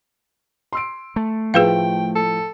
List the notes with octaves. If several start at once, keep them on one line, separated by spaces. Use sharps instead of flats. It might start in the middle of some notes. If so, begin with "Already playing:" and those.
C6 E6 D7
A3
A2 F3 G#4 B4 F5 G5
A4